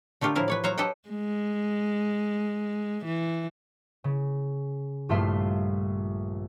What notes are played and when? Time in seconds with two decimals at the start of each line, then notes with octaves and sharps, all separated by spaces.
0.21 D3 A3 F4 G4 A#4
0.35 A2 F3 E4 A#4 F5
0.48 B4 C#5 D5
0.64 F#3 C5 C#5 F5 A#5
0.78 G4 A4 B4 D#5 F#5 G5
1.09 G#3
3.05 E3
4.04 C#3
5.09 A#1 G2 A3 F4 E5 C6